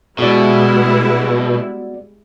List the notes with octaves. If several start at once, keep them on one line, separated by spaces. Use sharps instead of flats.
B2 G3 G#3 B3 E4 F#4 D5